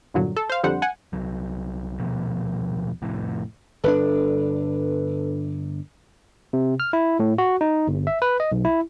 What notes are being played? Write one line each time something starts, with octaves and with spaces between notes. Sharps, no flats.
E2 G2 A#2 D3 F#3
A4
C5 F5
F2 D3 G3 C5 F#5
F#5 G#5
C2 F#3
D#1 B2 F3 B3
F1 F2 A2
G1 D3 D4 A4 B4
C3
F6
E4
A2
F#4
D#4
G1
E5
B4
D#5
B1
E4